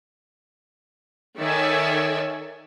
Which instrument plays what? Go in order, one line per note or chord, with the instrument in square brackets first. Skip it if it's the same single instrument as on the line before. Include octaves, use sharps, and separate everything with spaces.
[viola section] D#3 A4 C#5 D5 E5 G#5